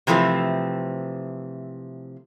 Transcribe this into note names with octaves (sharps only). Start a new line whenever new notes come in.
C3 E3 F3 A3 C4